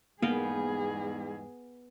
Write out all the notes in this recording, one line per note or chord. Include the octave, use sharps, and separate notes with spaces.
E2 G#2 G3 A#3 B3 G#4 F5 G5